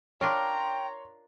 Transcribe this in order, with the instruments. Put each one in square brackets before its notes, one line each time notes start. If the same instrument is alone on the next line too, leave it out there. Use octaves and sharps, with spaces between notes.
[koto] D4 F4 A#4 [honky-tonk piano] C#5 C6 [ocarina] G5 [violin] A#5